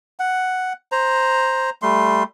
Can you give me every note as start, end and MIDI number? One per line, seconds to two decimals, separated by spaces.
0.19 0.73 78
0.92 1.70 72
0.92 1.70 82
1.82 2.23 55
1.82 2.23 57
1.82 2.23 84